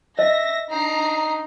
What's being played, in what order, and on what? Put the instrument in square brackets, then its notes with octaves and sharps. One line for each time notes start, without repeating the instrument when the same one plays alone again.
[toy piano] D#5 [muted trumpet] E5 [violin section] A#6
[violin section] D4 A#5 C7 [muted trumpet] D#4